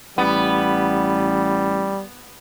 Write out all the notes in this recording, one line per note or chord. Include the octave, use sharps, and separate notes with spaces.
A1 G3 B3